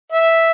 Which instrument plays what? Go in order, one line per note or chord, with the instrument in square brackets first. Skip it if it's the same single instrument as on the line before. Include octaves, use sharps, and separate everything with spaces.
[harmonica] E5